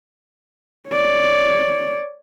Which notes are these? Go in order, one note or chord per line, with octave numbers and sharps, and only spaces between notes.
C#5 D5